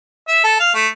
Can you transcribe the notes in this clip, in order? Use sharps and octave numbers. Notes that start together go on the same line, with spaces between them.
E5
A4
F5
A3